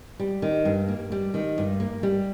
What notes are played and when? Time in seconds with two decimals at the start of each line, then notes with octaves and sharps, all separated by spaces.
0.20 G3
0.42 D#3
0.65 G2
0.88 A#3
1.12 G3
1.34 D#3
1.58 G2
1.80 A#3
2.03 G3